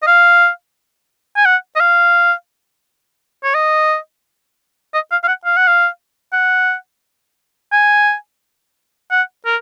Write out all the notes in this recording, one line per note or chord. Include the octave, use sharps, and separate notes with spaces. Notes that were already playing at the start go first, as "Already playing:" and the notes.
D#5
F5
G#5
F#5
D#5
F5
C#5
D#5
D#5
F5
F5
F#5
F5
F#5
F5
F#5
G#5
F#5
A#4